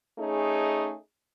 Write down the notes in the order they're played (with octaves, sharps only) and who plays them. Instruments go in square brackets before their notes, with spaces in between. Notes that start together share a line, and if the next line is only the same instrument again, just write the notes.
[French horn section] A3 C#4 D#4 G#4